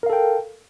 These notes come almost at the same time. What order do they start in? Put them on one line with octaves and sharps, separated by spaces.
A#4 F5 A4 G5